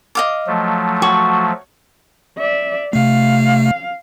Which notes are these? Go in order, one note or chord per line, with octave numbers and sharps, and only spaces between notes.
D#5 F5 D6
F3 F#3 A3
F#4 C#5
D5 E5
C3 A3 F5